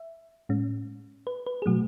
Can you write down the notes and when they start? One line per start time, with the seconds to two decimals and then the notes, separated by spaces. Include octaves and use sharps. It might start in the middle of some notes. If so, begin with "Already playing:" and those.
Already playing: E5
0.49 A2 G#3 C#4
1.27 B4
1.46 B4
1.62 G#4
1.66 B2 F#3 A3 F#4